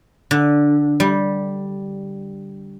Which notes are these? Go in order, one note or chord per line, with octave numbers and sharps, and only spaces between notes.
D3
G3